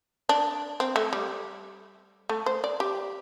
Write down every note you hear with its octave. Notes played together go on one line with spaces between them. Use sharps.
D4
C4
A3
G3
A3
C5
D5
G4